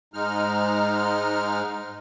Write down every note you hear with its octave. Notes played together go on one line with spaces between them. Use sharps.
G#2 G#3 D#4 F6